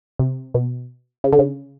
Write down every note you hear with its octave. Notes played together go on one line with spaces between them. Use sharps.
C3
B2
C#3
D3
C#3